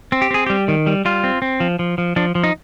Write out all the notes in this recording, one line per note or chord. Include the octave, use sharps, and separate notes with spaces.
C4
G4
C4 G#4
G3 G4
D#3
G3
G3 F4
C4
C4
F3
F3
F3
F3 D4
F3
D#4